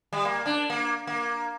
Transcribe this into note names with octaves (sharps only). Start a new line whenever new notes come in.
G3
A#3
D4
A#3
A#3